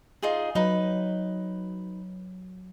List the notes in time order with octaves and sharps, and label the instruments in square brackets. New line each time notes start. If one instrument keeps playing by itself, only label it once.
[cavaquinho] D#4 F4 G#4
[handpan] F#3 [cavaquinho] D#4 B4